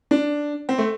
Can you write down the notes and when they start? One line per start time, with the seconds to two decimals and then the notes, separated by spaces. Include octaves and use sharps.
0.11 D4
0.69 C4
0.78 A3